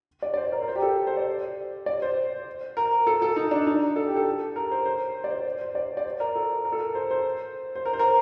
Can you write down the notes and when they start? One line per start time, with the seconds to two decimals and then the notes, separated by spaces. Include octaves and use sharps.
0.22 D5
0.34 D5
0.37 C5
0.52 A#4
0.63 A#4
0.68 C5
0.75 G4
0.82 A4
1.07 C5
1.17 D5
1.86 D5
2.02 C5
2.77 A#4
3.07 A4
3.22 A4
3.36 D#4
3.51 D4
3.67 D#4
3.96 A4
4.06 G4
4.16 A4
4.56 A#4
4.71 C5
4.86 C5
5.24 D5
5.30 C5
5.61 C5
5.75 D5
5.97 D5
6.06 C5
6.20 A#4
6.36 A4
6.65 A#4
6.72 A4
6.80 A#4
6.95 C5
7.11 C5
7.75 C5
7.85 A#4
7.93 C5
7.99 A#4